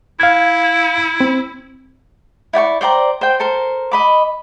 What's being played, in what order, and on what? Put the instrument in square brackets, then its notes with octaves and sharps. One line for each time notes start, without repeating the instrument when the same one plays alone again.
[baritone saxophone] E4 [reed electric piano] F5 G#6
[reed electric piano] C4
[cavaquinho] E4 D5 G5 C#6
C5 D5 G5 A#5
C5 G5
A4 A#4 C5
D#5 B5 D6